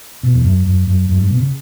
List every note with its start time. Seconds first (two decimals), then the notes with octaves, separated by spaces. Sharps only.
0.23 B2
0.34 E2
0.44 F#2
0.66 F#2
0.87 F#2
1.09 F#2
1.18 G2
1.30 B2
1.40 C#3